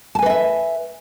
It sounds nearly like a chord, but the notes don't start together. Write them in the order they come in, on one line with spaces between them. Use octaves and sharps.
A5 G#5 B4 D#5 E5